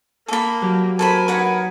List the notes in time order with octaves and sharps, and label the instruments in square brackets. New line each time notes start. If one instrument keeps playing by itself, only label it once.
[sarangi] A#3 [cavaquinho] A4 B5
[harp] F#3 G4
[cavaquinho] A4 C5 B5 [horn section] A#4 [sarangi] G#5
[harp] D#4 C#5 [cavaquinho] B4 F#5 B5